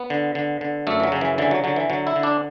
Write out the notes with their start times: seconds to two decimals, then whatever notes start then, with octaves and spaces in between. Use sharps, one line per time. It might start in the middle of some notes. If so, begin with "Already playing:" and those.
Already playing: B3
0.10 D3
0.35 D3
0.61 D3
0.87 F#2 A3
1.00 E3
1.03 F#3
1.12 C#3
1.21 E3
1.38 D3 E3
1.51 F#3
1.64 D3 F#3
1.76 E3
1.90 D3 F#3
2.07 E4
2.16 D3
2.23 D4